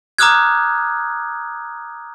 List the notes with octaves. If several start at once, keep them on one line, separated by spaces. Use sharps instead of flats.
A#5 D6 D#6 F6 F#6 G#6